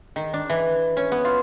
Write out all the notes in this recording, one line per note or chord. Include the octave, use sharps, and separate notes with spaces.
D#3
D4
E3
C#4
B3
F4